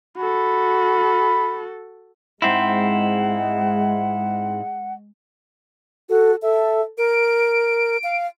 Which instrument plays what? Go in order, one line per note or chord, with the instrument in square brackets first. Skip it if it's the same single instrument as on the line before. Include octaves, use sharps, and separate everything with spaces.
[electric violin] F#4 A4 [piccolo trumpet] B5
[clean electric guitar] G#2 C4 E4 [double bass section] G#3 [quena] F#5
[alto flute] F#4 [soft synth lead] A4
[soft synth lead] A4 [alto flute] E5
[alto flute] A#4 [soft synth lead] D7
[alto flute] F5